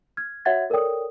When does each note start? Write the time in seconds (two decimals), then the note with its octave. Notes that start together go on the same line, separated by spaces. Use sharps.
0.17 F6 G#6
0.45 F#4 C#5 E5 F#5 G#6 A6
0.70 A4 A#4 C#5 D5 G5 D#6